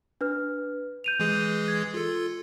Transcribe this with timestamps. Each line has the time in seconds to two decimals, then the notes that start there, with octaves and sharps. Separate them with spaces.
0.21 D4 B4 F6
1.04 G6 D#7 F7
1.20 E3 G#3 G#4
1.68 G#6
1.94 F4 A4